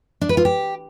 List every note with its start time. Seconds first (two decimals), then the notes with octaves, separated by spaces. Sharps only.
0.21 D4
0.29 B4
0.37 F4
0.45 G4